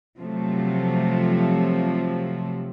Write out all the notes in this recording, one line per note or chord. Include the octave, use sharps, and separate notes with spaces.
C3 F3 F#3 A3